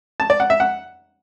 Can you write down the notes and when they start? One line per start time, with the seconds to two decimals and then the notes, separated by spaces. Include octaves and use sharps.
0.20 A5
0.30 D5
0.40 F#5
0.50 E5
0.60 F#5